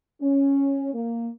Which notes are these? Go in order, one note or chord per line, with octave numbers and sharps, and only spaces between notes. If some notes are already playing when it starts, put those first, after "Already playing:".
C#4
A#3